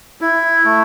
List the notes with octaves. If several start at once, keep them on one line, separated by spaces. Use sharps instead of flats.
E4
A3